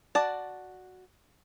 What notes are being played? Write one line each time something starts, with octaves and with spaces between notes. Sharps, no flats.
F#4 D5 A5